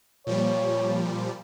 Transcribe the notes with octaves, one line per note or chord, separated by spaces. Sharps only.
A#2 F3 G3 C#5